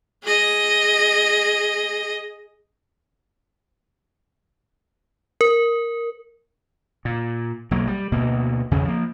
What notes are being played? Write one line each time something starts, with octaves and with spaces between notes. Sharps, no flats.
G#4 D#5
A#4
A#2
B1 F#3 A#3
G3
D2 B2 A#3
E2 C#3 E3 C#4
F3 A#3